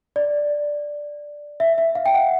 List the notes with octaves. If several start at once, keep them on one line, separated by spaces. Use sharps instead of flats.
D5
E5
E5
F5
G5
F#5